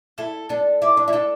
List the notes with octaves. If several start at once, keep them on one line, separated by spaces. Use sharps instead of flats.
E4 A4
D4 A4
E4 D5
D4
E4
D4 A4